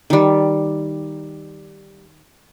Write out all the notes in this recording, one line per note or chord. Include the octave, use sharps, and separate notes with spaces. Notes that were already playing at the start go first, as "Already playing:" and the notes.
D#3 G3